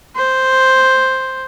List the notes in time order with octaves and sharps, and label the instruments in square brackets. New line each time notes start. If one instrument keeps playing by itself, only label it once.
[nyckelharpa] C5